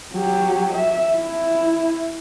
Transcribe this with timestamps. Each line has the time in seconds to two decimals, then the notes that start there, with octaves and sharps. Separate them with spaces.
0.14 F#3 G4
0.74 E5
1.16 E4